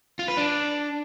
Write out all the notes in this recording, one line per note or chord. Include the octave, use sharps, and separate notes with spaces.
F4
B4
D4